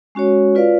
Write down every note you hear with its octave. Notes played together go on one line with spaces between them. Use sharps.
G#3 C#4 F#4 C#5
F4 B4 D5 F5